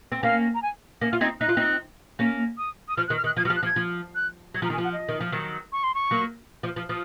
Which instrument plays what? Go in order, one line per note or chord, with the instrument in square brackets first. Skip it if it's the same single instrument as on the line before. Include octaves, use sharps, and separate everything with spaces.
[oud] C4
[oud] A#3 C#4 [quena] F5
[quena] A#5
G#5
[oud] A#3 C#4
[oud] F4 [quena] F6
[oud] C4 D#4 [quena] G#6
[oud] D#4 [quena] F#6
[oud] F4
C4 D#4
A#3 C#4
[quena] D#6
D#6
[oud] F3 [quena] F6
[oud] D#3 [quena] F#6
[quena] F6
[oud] D#3 [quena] F#6
[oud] F3 [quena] G#6
[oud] F#3 [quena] F6
[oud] F3
[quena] F#6
[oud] F3
[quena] G#6
[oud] F3
[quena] F#6
[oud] F#3 [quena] G#6
[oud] F3 [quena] A#5
[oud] D#3
[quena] G#5
[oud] F3
[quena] F#5
D#5
[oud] D#3
F3
D#3 F#3
[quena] C#6
C6
C#6
[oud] F#3 A#3
F3
F3
[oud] F3 [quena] D#6